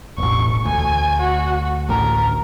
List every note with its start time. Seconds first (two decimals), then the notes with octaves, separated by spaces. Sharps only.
0.18 E1 A1 C#6
0.65 D2 G#5
1.21 F#4
1.89 A1 D2 A#4